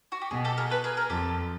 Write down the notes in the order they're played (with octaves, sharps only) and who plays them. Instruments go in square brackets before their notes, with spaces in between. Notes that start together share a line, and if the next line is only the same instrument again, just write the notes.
[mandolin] F#4
G4
[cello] B2 [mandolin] G#4
[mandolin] G4 A4
G#4 A#4
A4 B4
G#4 A#4
G#4 A#4
[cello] F2 [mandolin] G4 A4